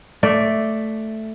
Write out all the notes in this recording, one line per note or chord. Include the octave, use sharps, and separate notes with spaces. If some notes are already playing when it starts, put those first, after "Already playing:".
A3 D5